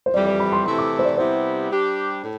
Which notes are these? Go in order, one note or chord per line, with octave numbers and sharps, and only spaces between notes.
C5
F2 E3 G3 D5
D5
B5
C6
C3 E3 A3 E4 A4 C6
D6
C5
D5
C3 G3 B3 E4 C5
G3 D4 G4
A2